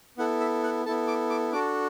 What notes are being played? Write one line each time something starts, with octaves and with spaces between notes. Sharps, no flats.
B3 E4 A4 F#5
E5
F#5
B3 E4 A4 A5
D6
D6
D4 F#4 A4 D6